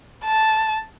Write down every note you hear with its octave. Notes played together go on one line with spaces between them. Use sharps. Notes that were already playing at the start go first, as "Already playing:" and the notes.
A5